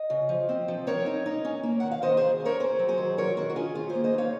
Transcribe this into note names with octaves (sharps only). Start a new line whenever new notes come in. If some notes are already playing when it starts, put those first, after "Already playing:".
Already playing: D#5
C#3
F3
C4
F3
C4 A#4 C#5
D#4
D#4
C#4
A#3
D#3 F#5
F5
D#3 C5 D#5
D#3 G#4 C5
C#4
A#4 C#5
C#4 G#4 C5
F#3
G#4 C5
D#3
D#3 A#4 C#5
D#3 F#4 A#4
F#4
C#4 F4 G#4
D#3 F4
G#4 C5
A#3
C5 D#5
D#4 C#5 F5